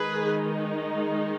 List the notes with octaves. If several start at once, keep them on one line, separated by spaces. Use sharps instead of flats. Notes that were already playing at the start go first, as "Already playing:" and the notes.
Already playing: D#3 G#3 D#4 G#4 B4